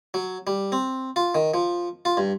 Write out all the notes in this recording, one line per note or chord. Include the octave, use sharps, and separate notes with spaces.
F#3
G3
C4
F4
D#3
F3
F4
G2